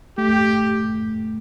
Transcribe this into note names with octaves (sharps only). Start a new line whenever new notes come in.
A3 G4